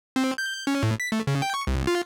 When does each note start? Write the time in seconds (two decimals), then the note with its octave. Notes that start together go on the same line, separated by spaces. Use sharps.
0.16 C4
0.38 G6
0.67 C#4
0.83 A2
1.00 B6
1.12 A3
1.27 C#3
1.42 G5
1.54 C#6
1.67 C2
1.87 F4